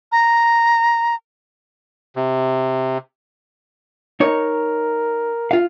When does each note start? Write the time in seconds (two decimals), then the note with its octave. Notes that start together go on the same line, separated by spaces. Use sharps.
0.12 A#5
2.16 C3
4.20 D#4 A#4 C#5
5.51 F4 F5